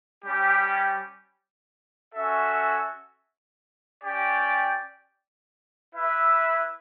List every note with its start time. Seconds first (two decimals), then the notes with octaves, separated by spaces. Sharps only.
0.24 G3 C#4 G4
2.13 C#4 F#4 A4 E5
4.03 C#4 G4 D5 G5
5.92 E4 B4 E5